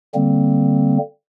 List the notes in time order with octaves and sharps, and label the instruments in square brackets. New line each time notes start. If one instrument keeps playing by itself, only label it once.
[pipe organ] D3 G3 A#3 C4